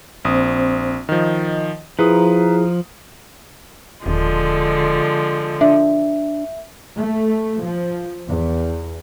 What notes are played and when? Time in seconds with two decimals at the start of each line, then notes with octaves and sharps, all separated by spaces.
0.25 A#1 C4 C5 D#6
1.09 D#3 F3 D#5
1.99 F3 E4 G#4 B4 A#5 D#6
4.06 D#1 D3 F3 G#3
5.61 D4 E5
6.97 A3
7.63 F3
8.29 E2